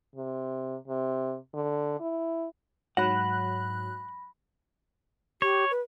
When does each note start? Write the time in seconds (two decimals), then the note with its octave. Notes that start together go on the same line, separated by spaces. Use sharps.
0.16 C3
0.88 C3
1.54 D3
2.00 E4
2.97 G#2 F#3 F#5 B5 F#6 A#6
5.42 G4 C#5
5.71 B4